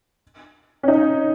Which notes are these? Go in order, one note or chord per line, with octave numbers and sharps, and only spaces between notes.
C#4
D#4